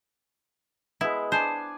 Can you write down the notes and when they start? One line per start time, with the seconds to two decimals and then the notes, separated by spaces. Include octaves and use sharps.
1.01 G#3 B3 E4
1.32 D4 C5 D5 G#5